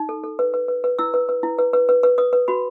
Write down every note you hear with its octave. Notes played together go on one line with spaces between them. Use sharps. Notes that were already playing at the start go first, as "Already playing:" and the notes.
Already playing: D#4
A4
A4
B4
B4
B4
B4
E4 E6
B4
B4
E4
B4
B4
B4
B4
B4 D#6
B4
F#4 B5